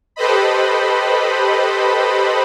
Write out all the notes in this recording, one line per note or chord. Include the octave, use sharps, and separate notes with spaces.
G4 A4 B4 C5 D#5 B5